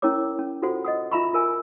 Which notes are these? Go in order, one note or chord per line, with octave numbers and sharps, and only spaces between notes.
C#4 E4 A#4 C#5 D6
C#4
F4 F#4 A4 C5 F#5
D#5 F#5 D#6
F4 E5 A#5 B5 C#6
F4 A#4 G#5